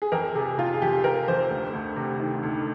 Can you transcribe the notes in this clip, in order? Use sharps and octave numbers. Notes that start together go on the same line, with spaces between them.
G#4
F2 A#4
C3 G#4
C3 F4
G#4
F2 G4
F2 A#4
F2 C5
D2
D2
C3
D#3
D2